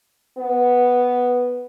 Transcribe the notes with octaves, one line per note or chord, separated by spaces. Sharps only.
B3